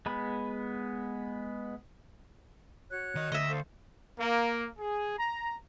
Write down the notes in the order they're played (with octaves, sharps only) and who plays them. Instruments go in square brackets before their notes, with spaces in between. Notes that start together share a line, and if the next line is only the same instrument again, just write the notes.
[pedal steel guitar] G#3 B3 B5
[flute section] F#4 C#5 F#6
[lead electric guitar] D#3 D#5
[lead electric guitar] D2 [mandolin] D#5 E5
[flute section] A4 C5 F5
[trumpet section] A#3
G#4
A#5